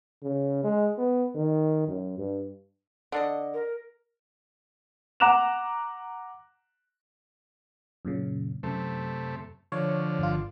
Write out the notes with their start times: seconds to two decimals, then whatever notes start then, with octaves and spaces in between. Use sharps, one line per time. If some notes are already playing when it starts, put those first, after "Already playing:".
0.23 C#3
0.64 G#3
0.98 B3
1.35 D#3
1.88 F#2
2.18 G2
3.12 D3 D4 D#5
3.54 A#4
5.20 F#5 A#5 D6 F#6 E7 F7
8.05 F#2 A#2 C#3
8.63 F#2 C3 A3
9.72 D3 F3 C#5
10.19 G1 F4